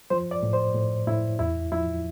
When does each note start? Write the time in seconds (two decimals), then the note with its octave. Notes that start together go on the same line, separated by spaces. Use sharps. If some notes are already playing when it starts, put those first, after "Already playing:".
0.10 F3 C5
0.31 D5
0.43 A2
0.53 C5
0.74 A2
1.07 A2 E4
1.39 E2 E4
1.72 F3 E4